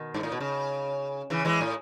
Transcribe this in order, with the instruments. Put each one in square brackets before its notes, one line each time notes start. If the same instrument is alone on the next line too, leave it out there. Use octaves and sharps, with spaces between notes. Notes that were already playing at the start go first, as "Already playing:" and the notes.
Already playing: [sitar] B2 D#3
G#2
A2
B2
C#3
C#3 E3
E3 G#3
A2